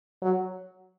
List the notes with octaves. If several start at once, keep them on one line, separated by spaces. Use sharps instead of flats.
F#3